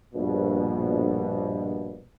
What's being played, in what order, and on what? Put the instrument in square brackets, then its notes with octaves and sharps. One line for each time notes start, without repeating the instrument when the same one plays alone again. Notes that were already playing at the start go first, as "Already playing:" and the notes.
[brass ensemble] A#1 G2 B2